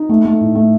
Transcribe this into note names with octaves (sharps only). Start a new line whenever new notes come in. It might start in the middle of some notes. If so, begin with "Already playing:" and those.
Already playing: D#4
A3
A3
A2
A3